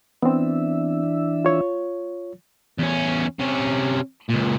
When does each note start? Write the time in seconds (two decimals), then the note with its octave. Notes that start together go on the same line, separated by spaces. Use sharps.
0.23 E3 B3 C4 D4 E5
1.45 F4 C#5
2.78 E2 C#4
3.40 C3 C#4
4.29 C#2 A#2